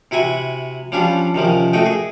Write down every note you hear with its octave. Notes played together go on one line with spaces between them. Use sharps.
C3 E4 F#4 F#5 G#5
F3 G3 C#4 D4 F4
C3 D#3 F3 C#4
A3 F#4 D#5 G5
G#4